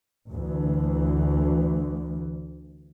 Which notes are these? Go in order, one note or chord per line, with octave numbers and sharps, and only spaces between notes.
D2 E3